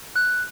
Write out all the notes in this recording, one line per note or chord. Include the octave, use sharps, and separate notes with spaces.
F#6